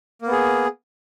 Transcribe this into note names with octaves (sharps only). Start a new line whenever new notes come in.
A#3 B3 G#4